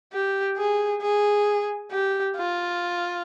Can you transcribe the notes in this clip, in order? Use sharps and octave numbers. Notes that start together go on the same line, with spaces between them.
G4
G#4
G#4
G4
F4